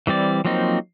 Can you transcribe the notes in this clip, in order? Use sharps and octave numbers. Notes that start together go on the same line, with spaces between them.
E3 G3 C4 D5
F3 F#3 A#3 C4 D#4